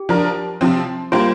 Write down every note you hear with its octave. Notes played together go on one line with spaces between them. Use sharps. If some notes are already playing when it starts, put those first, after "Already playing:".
Already playing: G4
F3 D4 A#4
C3 F3 C4
G3 A#3 F4 G4 C5